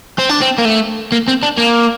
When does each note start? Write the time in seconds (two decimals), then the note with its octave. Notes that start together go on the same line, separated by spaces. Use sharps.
0.19 C4
0.30 D4
0.42 C4
0.59 A#3
0.65 A3
1.12 A#3
1.28 C4
1.43 D4
1.57 A#3